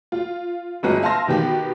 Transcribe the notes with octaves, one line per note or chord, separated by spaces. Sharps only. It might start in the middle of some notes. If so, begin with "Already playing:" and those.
F4
G1 G#3 C#4 F#4 B4 D#7
E5 F5 A5 C6 A#6
B2 D#3 B3 G4